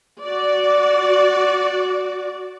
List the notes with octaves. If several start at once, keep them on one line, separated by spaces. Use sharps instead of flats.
F#4 D5